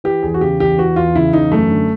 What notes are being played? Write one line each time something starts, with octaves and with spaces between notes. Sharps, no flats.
E3 G4
E2 G#4
F#4
C#3 G4
E2 G4
E3 F#4
E2 F4
C#3 E4
E2 D#4
F#2 A3
D3